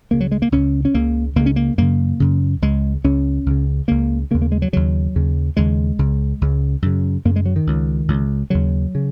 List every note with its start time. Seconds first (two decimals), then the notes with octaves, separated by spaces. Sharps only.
0.11 C#2 C#3 A#3
0.20 F#3
0.31 G#3
0.42 A#3
0.52 C#2 C#3 C#4
0.85 C#4
0.94 C#2 C#3 A#3
1.36 C#2 C#3 A#3
1.46 C#4
1.56 A#3
1.78 F#2 C#3 A#3
2.20 F#2 C#3
2.62 C#2 C#3 G#3
3.04 C#2 C#3 C#4
3.46 C#2 C#3
3.88 C#2 C#3 A#3
4.31 C#3 A#3
4.34 D#2
4.42 A#3
4.52 G#3
4.62 F#3
4.73 D#2 C#3 F#3
5.15 D#2 C#3
5.57 D#2 C#3 G#3
5.99 C#2 C#3
6.41 C#2 C#3
6.82 F#2 C#3
7.25 F#2 C#3 A#3
7.36 G#3
7.46 F#3
7.56 D#3
7.67 C#2 C#3
8.08 C#2 C#3
8.50 D#2 C#3 F#3
8.95 C#3